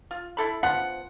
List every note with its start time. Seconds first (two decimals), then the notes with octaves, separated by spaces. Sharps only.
0.11 F4
0.37 E4 A4 B5
0.63 F3 B3 F#5